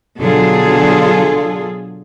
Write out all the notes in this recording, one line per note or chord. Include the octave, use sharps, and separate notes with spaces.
B2 D3 F#3 F4 G#4 A4